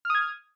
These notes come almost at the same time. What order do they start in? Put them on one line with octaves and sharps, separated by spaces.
F6 D#6 G#6